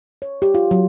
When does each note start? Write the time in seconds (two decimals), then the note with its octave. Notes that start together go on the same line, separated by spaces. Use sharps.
0.22 C#5
0.42 G4
0.55 F4
0.71 F#3